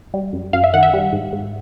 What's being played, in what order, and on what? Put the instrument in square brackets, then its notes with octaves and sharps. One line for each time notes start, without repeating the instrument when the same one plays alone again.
[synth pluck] G3
F#2
F#2 F5
E5
D#3 F#5
E5
G3
G#2
G#2